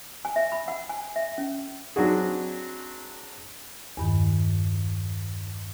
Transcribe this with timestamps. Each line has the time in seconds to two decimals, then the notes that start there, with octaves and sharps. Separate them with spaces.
0.25 G#5
0.36 E5
0.52 B5
0.68 F#5
0.89 G#5
1.16 E5
1.38 C#4
1.96 F#3 C4 D4 F#4 G#4
3.97 E2 G2 D#3